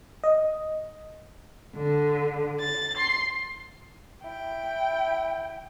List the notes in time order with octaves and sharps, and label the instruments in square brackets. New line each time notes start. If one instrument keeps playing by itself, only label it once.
[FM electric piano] D#5
[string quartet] D3
A6
C6
[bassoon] E4 [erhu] G5